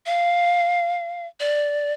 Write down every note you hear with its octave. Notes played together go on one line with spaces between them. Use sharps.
F5
D5